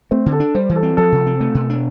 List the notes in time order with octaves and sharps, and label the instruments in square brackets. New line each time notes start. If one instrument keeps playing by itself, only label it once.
[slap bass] A3 [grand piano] C4
[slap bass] D3
[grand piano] A4
[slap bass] D4
[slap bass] G3 [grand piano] C5
[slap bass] E3
[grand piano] A4
[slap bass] C4
[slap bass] F3 [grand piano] A4
[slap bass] C3
C4
A3
B2
D4